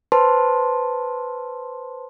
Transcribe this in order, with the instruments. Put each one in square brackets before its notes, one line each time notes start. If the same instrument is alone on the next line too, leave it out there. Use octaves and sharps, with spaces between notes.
[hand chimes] B4 C5 A5 C6